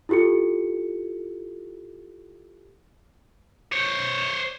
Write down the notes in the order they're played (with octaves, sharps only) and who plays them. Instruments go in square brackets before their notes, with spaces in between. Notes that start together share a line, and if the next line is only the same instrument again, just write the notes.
[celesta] E4 F4 G4 A4 C#7
[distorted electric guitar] C5 C#5